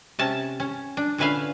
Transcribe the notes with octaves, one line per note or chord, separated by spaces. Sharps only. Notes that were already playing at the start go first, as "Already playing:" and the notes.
C3 C#4 A5
C#4
D4
A#2 D3 C#4 B4 E5 F5